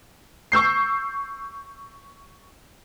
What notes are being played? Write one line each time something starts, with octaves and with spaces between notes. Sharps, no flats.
C#6 E6 G6 C7